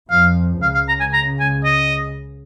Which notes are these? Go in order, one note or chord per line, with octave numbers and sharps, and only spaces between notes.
F2 F3 F5
C#2 C#3 F5
F5
A#5
G#5
A#5
G#5
D#5